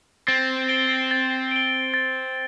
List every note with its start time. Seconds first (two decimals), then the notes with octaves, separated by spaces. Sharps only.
0.28 C4 A6
0.69 D7 G7
1.11 A6
1.51 D7 G7
1.94 A6